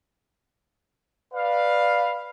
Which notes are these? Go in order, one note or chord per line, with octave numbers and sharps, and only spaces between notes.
B4 D5 F5